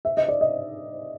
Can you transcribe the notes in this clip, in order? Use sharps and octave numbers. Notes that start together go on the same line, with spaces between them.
E5
D#5
D5
D#5